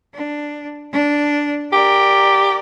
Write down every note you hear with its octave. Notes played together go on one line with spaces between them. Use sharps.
D4
D4
G4 A#4 D5